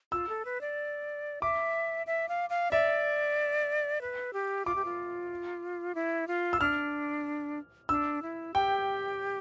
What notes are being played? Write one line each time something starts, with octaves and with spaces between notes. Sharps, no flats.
F4 E6
A4
B4
D5
E5 D6
E5
F5
F5
D5 E5
B4
G4
F4 D6
G4
F4
E4
F4
E6
D4 F6
D4 E6
E4
G4 G5